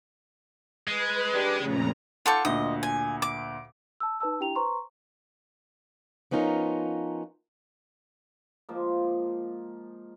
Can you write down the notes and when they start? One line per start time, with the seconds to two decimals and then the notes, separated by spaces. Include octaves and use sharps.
0.88 G#3 B4
1.33 D4 G4
1.62 F2 A#2 C#3 A3 A#5
2.26 F4 A4 F#5 C#6 D6 G6
2.45 D2 A#2 D#5
2.83 G#5
3.22 D6
4.00 A5 E6
4.20 D#4 B4 A5 E6
4.40 D4 E4 G4 G5 A#5 F7
4.55 B4 C5 A#5 C6 C#6
6.31 F3 B3 C#4 D#4 F4 A#4
8.69 F3 G#3 A#3